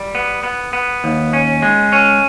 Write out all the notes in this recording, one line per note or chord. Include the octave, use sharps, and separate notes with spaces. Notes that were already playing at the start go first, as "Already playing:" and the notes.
Already playing: G3
B3
B3
B3
D#2
C#4
G#3
C#4